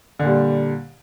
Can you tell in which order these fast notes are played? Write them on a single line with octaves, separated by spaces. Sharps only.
D3 A#2 G3